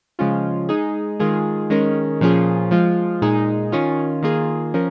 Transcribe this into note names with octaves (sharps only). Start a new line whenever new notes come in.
C#3 F3 G#3 C#4 F4
G#3 D#4 G#4
D#3 G#3 F4 G#4
D#3 G#3 C#4 A#4
A#2 F3 C#4 F4 G#4
F3 G#3 F4
A#2 G#3 D#4 G#4
D#3 C#4 F4
D#3 A#3 F4 G#4
F3 C#4 A#4